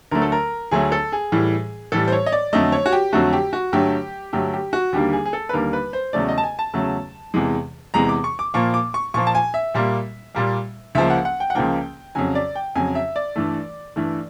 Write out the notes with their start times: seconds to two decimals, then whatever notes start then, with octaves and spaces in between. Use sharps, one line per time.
0.11 D2 D3 F#3 A3 A#4
0.22 A4
0.32 A#4
0.71 D2 D3 F#3 A3 G#4
0.92 A4
1.12 G#4
1.32 A2 E3 G3
1.92 A2 E3 G3 A4
2.08 C5
2.12 C#5
2.26 D#5
2.32 D5
2.53 F2 D3 F#3 A3 D#5
2.72 C#5
2.86 F#4
2.92 G4
3.12 F2 D3 F#3 A3 F#4
3.33 G4
3.53 F#4
3.73 G2 D3 F#3 A3 G4
4.33 G2 D3 F#3 A3 G4
4.53 G4
4.73 F#4
4.93 D#2 D3 G3 A#3 G4
5.13 G#4
5.25 G#4
5.33 A4
5.49 B4
5.53 D#2 D3 G3 A#3 A#4
5.73 B4
5.93 C5
6.13 E2 C#3 F#3 A3 D5
6.29 D#5
6.38 A5
6.44 G#5
6.59 A5
6.74 E2 C#3 F#3 A3
7.34 E2 C3 E3 G#3
7.94 E2 C3 E3 G#3 A#5
8.09 D6
8.24 C#6
8.39 D6
8.54 A#2 F3 A#3 C#6
8.74 D6
8.94 C#6
9.14 A#2 F3 A#3 C#6
9.27 A5
9.35 G#5
9.54 E5
9.75 A#2 G3 A#3
10.35 A#2 G3 A#3
10.95 C#2 C#3 F3 A#3 E5
11.10 F#5
11.25 F#5
11.40 G5
11.50 F#5
11.55 C#2 C#3 F3 A#3 G5
12.15 F2 C#3 F#3 G#5
12.35 D5
12.55 G5
12.76 F2 C#3 F#3 G#5
12.95 E5
13.16 D5
13.36 G2 E3 A3
13.96 G2 E3 A3